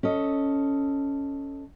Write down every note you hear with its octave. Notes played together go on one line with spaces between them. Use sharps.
C#4 A4 D#5